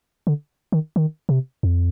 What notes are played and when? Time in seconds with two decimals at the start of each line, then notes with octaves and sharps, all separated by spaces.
0.27 D3
0.72 D#3
0.96 D#3
1.29 C3
1.63 F2